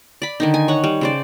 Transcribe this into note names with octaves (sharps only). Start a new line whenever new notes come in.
D5 B5
D3 D#3 D#4
G#5
C#5 F#5
G3
C#3 C5 D5